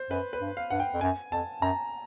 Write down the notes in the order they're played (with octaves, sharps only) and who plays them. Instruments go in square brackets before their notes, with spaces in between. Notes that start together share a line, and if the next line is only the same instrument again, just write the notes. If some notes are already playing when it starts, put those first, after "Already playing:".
Already playing: [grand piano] C5
[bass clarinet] F#2 [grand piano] B4
[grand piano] B4
[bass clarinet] G2
[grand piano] F5
[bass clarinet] G2 [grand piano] F#5
[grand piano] G5
[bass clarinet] F2
[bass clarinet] F#2 [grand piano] G#5
[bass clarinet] F2 [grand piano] A5
[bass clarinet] F#2 [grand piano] A#5